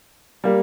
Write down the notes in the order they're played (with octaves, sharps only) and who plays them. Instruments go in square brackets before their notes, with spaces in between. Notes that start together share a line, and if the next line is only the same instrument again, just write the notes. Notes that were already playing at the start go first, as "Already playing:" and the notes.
[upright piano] G3 A#3